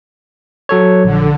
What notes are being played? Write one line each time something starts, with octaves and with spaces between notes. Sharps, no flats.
F#3 A4 C#5
A#1 D3